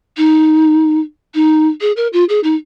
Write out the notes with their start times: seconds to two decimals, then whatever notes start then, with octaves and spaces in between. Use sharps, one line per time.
0.17 D#4
1.34 D#4
1.81 G#4
1.96 A#4
2.13 F4
2.29 G#4
2.43 D#4